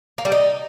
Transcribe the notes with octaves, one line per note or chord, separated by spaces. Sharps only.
A#3
G3
D#4